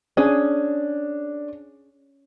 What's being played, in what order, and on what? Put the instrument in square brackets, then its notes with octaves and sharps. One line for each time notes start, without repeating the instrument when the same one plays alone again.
[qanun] C#4 G#4 [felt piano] D4